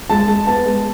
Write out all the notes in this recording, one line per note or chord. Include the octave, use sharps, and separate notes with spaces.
G#3 A5
G#3
B3 A5
G#3